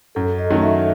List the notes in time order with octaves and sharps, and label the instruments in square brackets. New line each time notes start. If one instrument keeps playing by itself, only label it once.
[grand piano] F#2 [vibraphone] A4
[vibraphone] D#5
[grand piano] D#3 F#3 A3 C#4
[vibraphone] E5